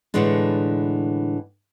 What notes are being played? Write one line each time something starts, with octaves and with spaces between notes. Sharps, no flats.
A2 D3 E3 G#3 D4